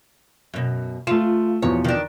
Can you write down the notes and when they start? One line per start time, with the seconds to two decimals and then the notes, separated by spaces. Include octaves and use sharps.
0.54 F#2 B2
1.07 A3 F4 E7
1.62 E2 B2 F3 C#5
1.84 D#3 D4